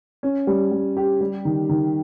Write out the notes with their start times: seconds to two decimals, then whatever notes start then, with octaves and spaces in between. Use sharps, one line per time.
0.23 C#4
0.47 G3
0.71 G3
0.97 G4
1.21 G3
1.45 D#3
1.69 D#3